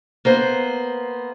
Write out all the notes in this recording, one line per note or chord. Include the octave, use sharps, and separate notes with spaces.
A#3 B3 C5